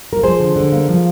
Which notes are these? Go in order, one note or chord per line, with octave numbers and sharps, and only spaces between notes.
A#4
F3 G#4 C5
D3
D3
A#3
F3